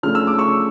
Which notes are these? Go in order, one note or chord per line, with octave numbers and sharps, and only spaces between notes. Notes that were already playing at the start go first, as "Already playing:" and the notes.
C#3 F3 A3 D4 F6
E6
D6
C#6 E6